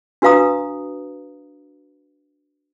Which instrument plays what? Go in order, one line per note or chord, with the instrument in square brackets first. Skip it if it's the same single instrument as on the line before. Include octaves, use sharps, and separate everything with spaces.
[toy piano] D4 F#4 B4 F5 A#5 D#6